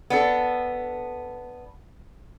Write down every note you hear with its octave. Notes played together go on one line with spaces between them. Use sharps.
B3 D4 A4